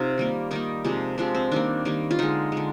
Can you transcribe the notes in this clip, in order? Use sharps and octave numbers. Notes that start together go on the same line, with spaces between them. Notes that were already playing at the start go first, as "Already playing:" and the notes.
Already playing: C3 D#4 F4
D#3 G3 A#3
D#3 G3 A#3 D#4
C3 F3 G#3
C3 F3 G#3 D4
C4
D#3 G3 A#3 D4
D#3 G3 A#3
F4
D3 G#3 D#4
D3 G#3